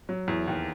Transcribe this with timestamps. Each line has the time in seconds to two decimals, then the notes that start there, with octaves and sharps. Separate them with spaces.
0.09 F#3
0.28 E2
0.48 D#2